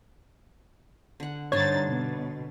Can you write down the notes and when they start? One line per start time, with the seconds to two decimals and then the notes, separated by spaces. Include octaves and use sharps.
1.20 D3 F#5
1.52 G2 D3 D4 D#4 C5 C#5 G#6 A6
1.88 B2